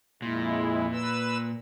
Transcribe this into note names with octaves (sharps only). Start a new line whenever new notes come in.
F2 A#2 G#3 E4
B4 E6